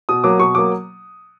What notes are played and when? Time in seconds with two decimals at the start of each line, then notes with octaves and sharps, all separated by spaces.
0.09 B2 D#6
0.24 F#3 A#3 D6
0.39 B2 C#6
0.55 F#3 A#3 D6